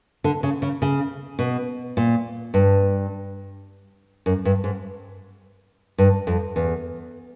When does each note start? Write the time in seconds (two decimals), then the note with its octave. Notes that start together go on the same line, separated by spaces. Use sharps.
0.24 D3
0.43 C#3
0.62 C#3
0.82 C#3
1.39 B2
1.97 A#2
2.54 G2
4.26 F#2
4.45 G2
4.64 G#2
5.98 G2
6.27 F2
6.56 E2